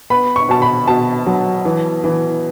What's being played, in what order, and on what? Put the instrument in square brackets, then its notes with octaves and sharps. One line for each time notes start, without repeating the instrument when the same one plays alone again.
[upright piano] B3 B5
C#6
B2 A5
B5
B2 A5
F#3
E3
E3